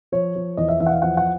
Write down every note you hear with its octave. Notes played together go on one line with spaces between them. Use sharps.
F3 C#5
F3
E2 D#5
E5
E2 E5
F#5
F5
F3 F#5
F#5